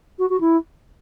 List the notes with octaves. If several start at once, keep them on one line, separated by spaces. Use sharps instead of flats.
F#4
F#4
E4